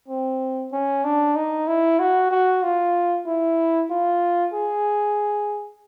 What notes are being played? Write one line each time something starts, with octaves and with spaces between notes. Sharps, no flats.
C4
C#4
D4
D#4
E4
F#4
F#4
F4
E4
F4
G#4